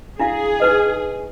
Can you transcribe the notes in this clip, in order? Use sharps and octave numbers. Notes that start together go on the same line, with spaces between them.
D4 E4 G#4 F5
D#4 B4 D#5